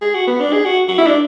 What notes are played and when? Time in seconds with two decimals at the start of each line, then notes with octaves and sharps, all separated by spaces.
0.01 G#4
0.15 F#4
0.27 B3
0.40 D4
0.53 G#4
0.65 F#4
0.88 F#4
0.98 E4
1.07 D4